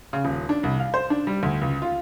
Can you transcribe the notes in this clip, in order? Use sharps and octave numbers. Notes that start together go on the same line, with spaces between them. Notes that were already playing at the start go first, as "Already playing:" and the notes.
C#3
D#1
D4
C2
F5
C5
D4
G3
D2
C#2
F4